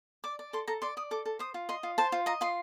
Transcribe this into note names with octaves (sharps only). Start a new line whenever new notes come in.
D5 D6
D5
A4 C6
A4 A#5
D5 C6
D5 D#6
A4 D6
A4
C5 D#6
F4
D#5 C6
F4
C5 A5
F4
D#5 A#5
F4 C6